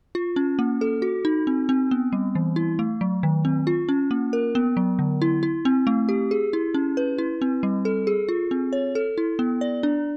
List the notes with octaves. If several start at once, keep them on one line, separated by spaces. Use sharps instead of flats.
F4
C#4
A#3
A4
F#4
D#4
C4
C4
B3
G3
E3
E4
A3
F#3
D#3
C4
F4
C#4
A#3
A#4
B3
F#3
D3
E4
E4
C4
A3
G4
G#4
E4
C#4
B4
E4
C4
G3
A4
G#4
F4
C4
C#5
A4
E4
B3
D5
D4